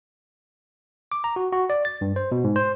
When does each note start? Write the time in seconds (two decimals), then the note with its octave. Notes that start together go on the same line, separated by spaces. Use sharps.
1.12 D6
1.24 A#5
1.36 F#4
1.52 F#4
1.70 D5
1.85 A6
2.01 G2
2.16 C5
2.32 B2
2.44 G#2
2.56 C5